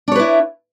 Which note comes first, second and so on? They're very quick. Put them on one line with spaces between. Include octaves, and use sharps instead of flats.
D4 C#5 B4 E4